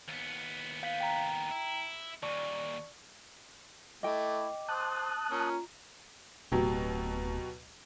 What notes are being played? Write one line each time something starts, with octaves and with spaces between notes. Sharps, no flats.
D#2 B3
F5 G6 B6
G5 A#5
E4
D#2 A#2 D5 A5 C#6
A3 E4 D#5 G5 D6
C5 A5 D#6 F#6
A#3 C#4 F4 A#5
D1 B2 F#3 G4